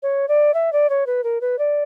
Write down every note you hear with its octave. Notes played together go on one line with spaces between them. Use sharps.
C#5
D5
E5
D5
C#5
B4
A#4
B4
D5